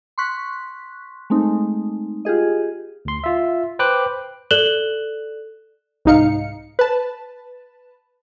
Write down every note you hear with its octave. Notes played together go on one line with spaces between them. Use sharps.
C6 C#6 F#6 B6
G#3 A3 C4 D#4
F4 G4 G#4 D#5
D2 C6
F4 E5
B4 C5 G5 D6 F#6
A4 D5 F#6 E7 F#7 G7
C2 G#2 D#4 F5 C#7
B4 A5